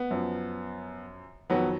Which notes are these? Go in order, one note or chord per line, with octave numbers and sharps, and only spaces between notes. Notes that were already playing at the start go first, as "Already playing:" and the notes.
Already playing: B3
F#2 F3
F2 D#3 F#3 B3